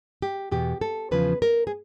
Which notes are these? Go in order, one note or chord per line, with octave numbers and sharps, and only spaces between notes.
G4
E2 B2 G4
A4
E2 C#3 F3 B4
A#4
G#4